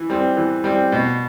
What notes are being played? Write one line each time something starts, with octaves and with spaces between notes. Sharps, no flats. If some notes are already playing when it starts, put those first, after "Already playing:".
Already playing: E3
G3 C4
E3
G3 C4
B2